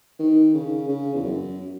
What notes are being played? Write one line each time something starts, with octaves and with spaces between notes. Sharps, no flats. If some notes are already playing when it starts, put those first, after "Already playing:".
D#3
C#3
C#3
E2
F#2